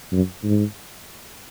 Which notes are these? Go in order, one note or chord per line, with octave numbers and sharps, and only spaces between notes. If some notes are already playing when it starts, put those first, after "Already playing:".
F#2
G#2